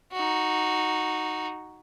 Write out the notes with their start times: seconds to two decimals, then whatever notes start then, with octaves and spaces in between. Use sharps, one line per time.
0.12 D#4 F#4